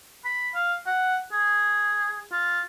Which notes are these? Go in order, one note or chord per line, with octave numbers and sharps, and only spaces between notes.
B5
F5
F#5
G#4
F4